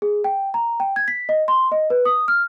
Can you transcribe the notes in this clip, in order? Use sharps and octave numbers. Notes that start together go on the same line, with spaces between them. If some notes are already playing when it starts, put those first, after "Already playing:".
G#4
G5
A#5
G5
G#6
B6
D#5
C6
D#5
B4
D#6
F6